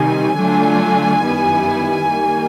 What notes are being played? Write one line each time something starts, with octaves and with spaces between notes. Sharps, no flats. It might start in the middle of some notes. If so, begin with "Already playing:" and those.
Already playing: C3 D#3 G3 C4 G#5
D3 F#3 A3 D4 F4
F#2 D#3 G3 B3 E4
D#3 G3 A#3